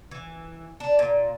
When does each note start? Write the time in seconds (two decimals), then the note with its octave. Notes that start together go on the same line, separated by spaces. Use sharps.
0.11 E3
0.80 D4
0.99 A#2